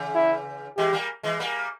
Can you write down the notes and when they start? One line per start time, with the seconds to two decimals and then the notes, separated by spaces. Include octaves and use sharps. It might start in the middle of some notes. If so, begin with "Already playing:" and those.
Already playing: C#3 E3
0.15 E4
0.77 E3 G#3 G4
0.93 G3 A#3
1.23 E3 G#3
1.39 G3 A#3